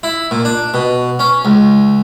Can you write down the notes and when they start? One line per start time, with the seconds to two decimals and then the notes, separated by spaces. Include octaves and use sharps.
0.03 E4
0.31 A#2
0.45 D4
0.74 B2
1.19 C#4
1.45 C#2